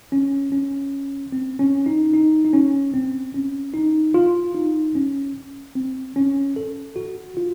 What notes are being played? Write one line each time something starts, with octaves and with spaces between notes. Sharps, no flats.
C#4
C#4
C4
C#4
D#4
D#4
D#4
C#4
C4
C#4
D#4
F4
D#4
C#4
C4
C#4
A4
F#4
F4